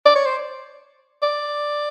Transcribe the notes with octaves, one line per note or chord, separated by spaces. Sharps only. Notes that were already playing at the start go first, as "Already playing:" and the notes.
D5
C#5
C5
D5